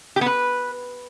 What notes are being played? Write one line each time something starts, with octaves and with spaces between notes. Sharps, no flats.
G4
B3
B4